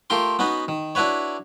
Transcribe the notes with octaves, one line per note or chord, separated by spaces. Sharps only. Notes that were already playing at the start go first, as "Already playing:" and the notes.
A3 F4 G4 A#4 C6
B3 C#4 D#4 F#4 B4
D#3
D4 E4 F#4 B4 C#5